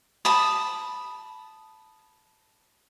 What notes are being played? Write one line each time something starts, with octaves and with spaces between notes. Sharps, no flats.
A5 B5 D#6